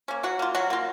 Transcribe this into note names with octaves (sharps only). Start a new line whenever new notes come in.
A#3 C#4
F#3 F#4
A#3 F4
F#3 F#4
A#3 F4